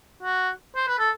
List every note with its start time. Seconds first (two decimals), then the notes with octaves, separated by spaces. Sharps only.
0.23 F#4
0.76 C5
0.87 B4
0.99 A4